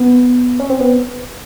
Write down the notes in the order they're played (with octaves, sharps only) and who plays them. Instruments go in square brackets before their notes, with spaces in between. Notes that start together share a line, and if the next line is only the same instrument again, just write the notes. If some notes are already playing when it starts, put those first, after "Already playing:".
Already playing: [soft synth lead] B3
C#4
C4
B3